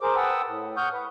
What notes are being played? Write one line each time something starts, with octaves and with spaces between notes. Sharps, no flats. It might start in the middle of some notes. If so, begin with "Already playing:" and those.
G#4 A#4 C5 D6
B4 F#5 G5 A5 D#6 E6
A2
F#5 C#6 D#6 F6 G6
B4